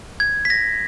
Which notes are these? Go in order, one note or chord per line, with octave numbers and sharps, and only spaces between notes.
G#6
B6
A#6